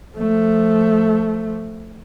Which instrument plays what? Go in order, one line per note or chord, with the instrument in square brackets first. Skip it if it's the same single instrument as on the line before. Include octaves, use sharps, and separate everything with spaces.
[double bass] F3 A3